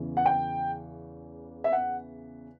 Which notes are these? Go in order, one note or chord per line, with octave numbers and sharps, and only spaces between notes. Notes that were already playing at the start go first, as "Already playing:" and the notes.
Already playing: E2 C#3 E3
F#5
G5
E5
F#5